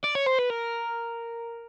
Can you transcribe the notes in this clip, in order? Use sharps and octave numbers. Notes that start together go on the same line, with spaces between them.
D5
C#5
C5
B4
A#4